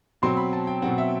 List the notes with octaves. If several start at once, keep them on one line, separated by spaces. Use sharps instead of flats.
B2 F#3 C4 C6
B5
A5
G5
B2 F#3 C4 F#5
E5